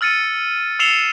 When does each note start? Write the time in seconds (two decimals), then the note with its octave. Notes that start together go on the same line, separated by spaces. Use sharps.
0.01 E6 F6 A6 C#7 D#7
0.79 E6 C7 C#7 E7 F7 G7